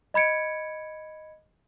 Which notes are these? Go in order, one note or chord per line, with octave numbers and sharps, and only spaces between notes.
D#5 B5 G#6 C#7 D7